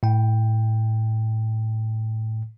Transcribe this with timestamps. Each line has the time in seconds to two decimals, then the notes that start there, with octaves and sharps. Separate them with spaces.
0.03 A2 G5